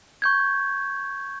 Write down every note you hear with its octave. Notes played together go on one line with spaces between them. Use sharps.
C#6 G6 G#6